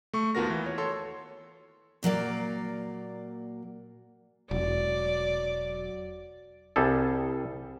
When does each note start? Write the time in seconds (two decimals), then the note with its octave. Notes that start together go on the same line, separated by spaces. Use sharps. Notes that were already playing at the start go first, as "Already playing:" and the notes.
0.13 A3 C#6
0.35 D#2 B3 F4 F#4 A#4 A#6
0.50 E3
0.66 C#5
0.78 A4 C#5 C6
2.03 A#2 F#3 A#3 D5
4.51 E1 F#3 D5
6.76 C2 G3 G#4 A4